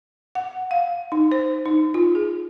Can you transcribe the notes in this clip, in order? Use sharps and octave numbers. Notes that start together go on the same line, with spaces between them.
F#5
F5
D#4
C5
D#4
F4
G#4